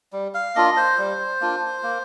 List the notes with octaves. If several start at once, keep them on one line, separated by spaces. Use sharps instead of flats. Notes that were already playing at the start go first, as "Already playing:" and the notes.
G3
F5
A#3 D4 F4 D#5
C5
G3
A#3 D4 F4
A#3